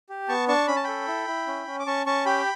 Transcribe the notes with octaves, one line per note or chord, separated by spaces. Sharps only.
G4
B3 A5 C#6
D4 A5 C#6
C#4 B5
A5
A4 G5 B5
E4
E4
C#4
C#4
D6
C#4 A5 C#6
C#4 A5 C#6
G4 G5 B5